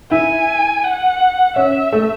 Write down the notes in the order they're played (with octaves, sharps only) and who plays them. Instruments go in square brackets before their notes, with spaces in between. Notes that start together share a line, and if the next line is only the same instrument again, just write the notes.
[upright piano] E4 [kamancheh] G#5
[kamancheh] F#5
[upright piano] C#4 [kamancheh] E5
[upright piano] A3